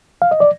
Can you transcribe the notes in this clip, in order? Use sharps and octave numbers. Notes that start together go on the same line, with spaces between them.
F5
D#5
D5